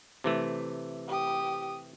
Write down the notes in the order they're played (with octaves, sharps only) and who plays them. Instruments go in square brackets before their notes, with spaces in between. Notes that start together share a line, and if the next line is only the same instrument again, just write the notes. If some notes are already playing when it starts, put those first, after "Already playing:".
[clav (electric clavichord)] C3 E3 A3
[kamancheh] G4 D#6